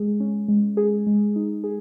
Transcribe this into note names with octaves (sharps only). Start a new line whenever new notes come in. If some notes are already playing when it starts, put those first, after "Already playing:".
Already playing: G#3 G#4
C#4
G#3
G#4
G#3
D#4
G#4